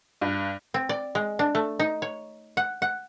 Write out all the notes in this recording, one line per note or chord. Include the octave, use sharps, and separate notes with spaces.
G2
C4
D5
G#3
D4
A3
D#4
C#5
F#5
F#5